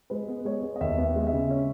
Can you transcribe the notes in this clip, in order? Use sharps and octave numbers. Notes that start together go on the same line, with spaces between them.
G#3 B4
B3
G#3 C#5
B3
D#5
D#2 E5
B3
E5
G#3
E5
C#3
C#4